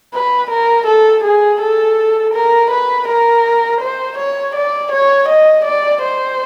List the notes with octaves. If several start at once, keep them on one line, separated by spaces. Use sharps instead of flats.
B4
A#4
A4
G#4
A4
A#4
B4
A#4
C5
C#5
D5
C#5
D#5
D5
C5